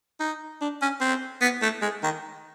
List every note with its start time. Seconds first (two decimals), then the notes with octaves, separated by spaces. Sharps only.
0.20 D#4
0.61 D4
0.82 C#4
1.01 C4
1.41 B3
1.62 A3
1.82 G#3
2.03 D#3